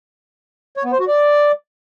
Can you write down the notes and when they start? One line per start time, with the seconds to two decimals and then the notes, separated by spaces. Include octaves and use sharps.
0.77 C#5
0.85 B3
0.92 C5
1.00 F#4
1.08 D5